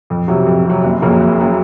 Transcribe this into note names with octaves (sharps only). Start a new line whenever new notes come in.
F2
C3 F#3
F2
C3 F#3
F#1
F2 C#3 F#3 A#3
F#1
C#3 F#3 A#3